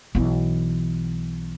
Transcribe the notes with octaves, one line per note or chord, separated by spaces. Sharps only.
B1 E3